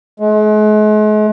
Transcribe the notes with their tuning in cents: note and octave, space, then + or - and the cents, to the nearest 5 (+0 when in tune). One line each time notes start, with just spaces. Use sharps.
G#3 +40